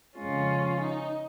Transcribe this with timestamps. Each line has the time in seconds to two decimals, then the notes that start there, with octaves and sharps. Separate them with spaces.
0.17 F2 C#3 F3 G#3 C#4 F4
0.81 D#4